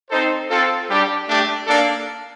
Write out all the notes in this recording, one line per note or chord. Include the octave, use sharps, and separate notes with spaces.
C4 D#4 A4 C5
C4 F4 A4
G3 D4 G4
A3 D4 G4
A#3 D4 A4 D5 F5